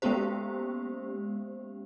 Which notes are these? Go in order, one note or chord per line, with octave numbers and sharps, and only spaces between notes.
G#3 A#3 B3 C#4 G4 C5